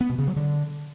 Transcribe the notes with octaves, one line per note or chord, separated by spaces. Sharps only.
B3
B2
C#3
F#3
D3